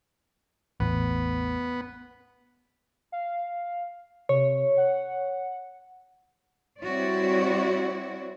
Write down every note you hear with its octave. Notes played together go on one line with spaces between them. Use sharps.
A1 E2 B3
F5
C3 C#5
F#5
G3 C4 E4 F#4 C#5 D5